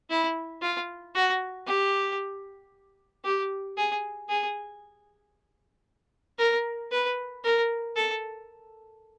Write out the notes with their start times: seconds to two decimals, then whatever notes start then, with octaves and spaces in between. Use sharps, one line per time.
0.10 E4
0.62 F4
1.15 F#4
1.67 G4
3.25 G4
3.77 G#4
4.29 G#4
6.39 A#4
6.91 B4
7.44 A#4
7.96 A4